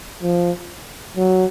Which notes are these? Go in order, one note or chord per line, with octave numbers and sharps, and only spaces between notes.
F3
F#3